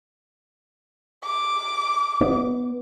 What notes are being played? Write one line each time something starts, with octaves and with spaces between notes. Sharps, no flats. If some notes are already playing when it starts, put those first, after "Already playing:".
D6
B3